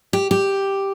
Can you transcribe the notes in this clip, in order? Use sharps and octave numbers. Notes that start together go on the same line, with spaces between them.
G4
G4